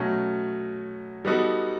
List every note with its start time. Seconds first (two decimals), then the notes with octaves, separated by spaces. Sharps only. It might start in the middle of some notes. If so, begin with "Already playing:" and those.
Already playing: B2 F#3 A3 C#4
1.25 G3 B3 D#4 F#4 A4